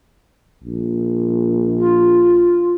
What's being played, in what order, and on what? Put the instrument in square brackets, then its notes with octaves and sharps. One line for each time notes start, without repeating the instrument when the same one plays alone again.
[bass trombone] A#1
[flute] F4